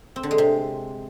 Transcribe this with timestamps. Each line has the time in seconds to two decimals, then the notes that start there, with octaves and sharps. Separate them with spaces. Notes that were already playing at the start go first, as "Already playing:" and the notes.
0.16 C4
0.23 D3
0.31 G#3
0.38 C3